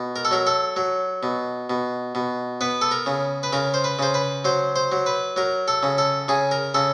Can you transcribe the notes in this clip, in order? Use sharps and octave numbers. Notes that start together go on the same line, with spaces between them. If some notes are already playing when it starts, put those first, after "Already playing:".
Already playing: B2
A#4
A4
F#3 A#4
A4
F#3
B2
B2
B2
B3 B4
A4
A#4
C#3
B4
C#3 A#4
C5
B4
C#3 C5
B4
F#3 C5
C5
F#3
B4
F#3 A#4
A4
C#3
A4
C#3 G#4
A#4
C#3 A4